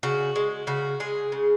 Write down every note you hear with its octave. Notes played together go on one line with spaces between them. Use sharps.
C#3 F#4
G#3
C#3 F#4
G#3 G#4
C#3